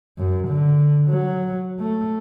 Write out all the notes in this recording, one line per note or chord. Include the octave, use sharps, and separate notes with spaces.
F#2
D3
F#3
A3